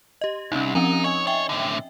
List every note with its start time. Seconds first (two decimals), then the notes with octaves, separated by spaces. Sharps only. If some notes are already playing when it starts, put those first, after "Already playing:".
0.21 G4 D#5
0.52 C2 C#4 D#4
0.75 F3 C4 C#4 D#4
1.04 C#5 D#5 G#5
1.27 C#5 E5 G5
1.49 A2 D3